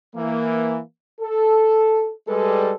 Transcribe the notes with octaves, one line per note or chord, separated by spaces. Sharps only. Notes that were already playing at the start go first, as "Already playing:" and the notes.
E3 A#3
A4
G3 G#3 A4 B4